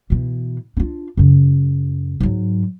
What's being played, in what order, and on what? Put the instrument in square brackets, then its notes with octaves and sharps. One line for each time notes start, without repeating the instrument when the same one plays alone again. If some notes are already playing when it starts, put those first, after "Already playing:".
[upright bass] B2 E3
D4 F4
F#2 C#3
G#2 F#3